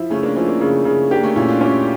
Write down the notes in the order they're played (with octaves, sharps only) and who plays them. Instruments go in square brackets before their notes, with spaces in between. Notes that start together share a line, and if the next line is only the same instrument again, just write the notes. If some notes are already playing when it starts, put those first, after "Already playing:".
Already playing: [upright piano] F3 E4
[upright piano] C#3 [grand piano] A3 C#4
[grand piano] A#3 D4
[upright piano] F3 [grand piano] C#4 E4
[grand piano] A#3 D4
[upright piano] C#3
C#3
[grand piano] A#3 D4 [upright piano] G4
[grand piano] A3 C#4
[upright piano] A#2 [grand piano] C#4 E4
[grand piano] D4 F4
[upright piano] C#4 [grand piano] E4 G4